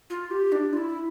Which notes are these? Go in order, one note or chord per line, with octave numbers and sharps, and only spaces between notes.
F4
G4
D4
F4
E4